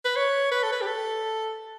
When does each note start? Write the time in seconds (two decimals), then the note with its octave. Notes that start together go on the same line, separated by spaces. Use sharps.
0.05 B4
0.16 C#5
0.51 B4
0.63 A4
0.72 B4
0.81 G4
0.87 A4